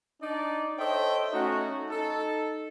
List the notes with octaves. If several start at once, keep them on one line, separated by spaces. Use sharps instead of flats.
D4 D#4 D5
A4 C5 C#5 D#5 E5 G5
A3 C#4 D#4 F#4
D#4 A4